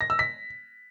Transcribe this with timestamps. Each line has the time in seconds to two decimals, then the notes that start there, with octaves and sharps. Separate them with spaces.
0.01 A#6
0.10 E6
0.19 B6